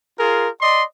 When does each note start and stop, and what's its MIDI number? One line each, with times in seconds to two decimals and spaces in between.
0.19 0.49 65
0.19 0.49 68
0.19 0.49 70
0.61 0.83 74
0.61 0.83 75
0.61 0.83 84